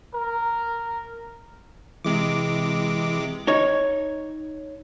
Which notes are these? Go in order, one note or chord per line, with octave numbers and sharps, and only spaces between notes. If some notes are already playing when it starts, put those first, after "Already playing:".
A#4
C3 E3 G#3 D6
D#4 C#5